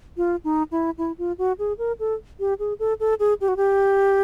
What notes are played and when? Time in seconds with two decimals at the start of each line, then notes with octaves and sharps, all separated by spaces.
0.17 F4
0.44 D#4
0.71 E4
0.98 E4
1.18 F4
1.38 F#4
1.59 G#4
1.78 A#4
2.00 A4
2.40 G4
2.59 G#4
2.79 A4
3.00 A4
3.20 G#4
3.41 G4
3.48 F#4
3.57 G4